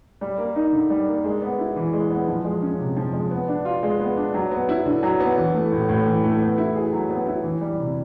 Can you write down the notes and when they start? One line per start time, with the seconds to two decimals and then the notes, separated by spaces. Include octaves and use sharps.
0.21 G3
0.38 A#3
0.55 D#4
0.72 D3
0.90 G3
1.07 A#3
1.24 G#3
1.42 B3
1.59 E4
1.76 E3
1.93 G#3
2.10 B3
2.27 F3
2.45 G#3
2.62 C#4
2.79 C3
2.97 F3
3.13 G#3
3.31 B3
3.48 D4
3.65 F4
3.83 G#3
4.00 B3
4.17 D4
4.34 F#3
4.51 B3
4.69 E4
4.86 D3
5.03 F#3
5.20 B3
5.38 E3
5.54 A3
5.72 A2
5.89 A2
6.06 E3
6.24 A3
6.41 B3
6.58 E4
6.75 G#4
6.92 F#3
7.10 B3
7.27 E4
7.44 E3
7.61 G3
7.78 C3